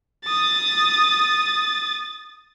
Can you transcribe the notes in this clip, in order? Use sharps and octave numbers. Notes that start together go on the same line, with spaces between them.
D#6 A6